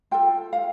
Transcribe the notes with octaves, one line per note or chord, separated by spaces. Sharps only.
F4 A4 G5
F5